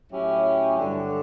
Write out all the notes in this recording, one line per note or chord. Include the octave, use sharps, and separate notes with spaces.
A2 F#3 C#4 E4 G4
G2 D3 F#3